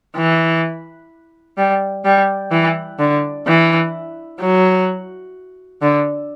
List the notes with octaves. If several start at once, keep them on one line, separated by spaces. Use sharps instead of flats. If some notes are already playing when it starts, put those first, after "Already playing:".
E3
G3
G3
E3
D3
E3
F#3
D3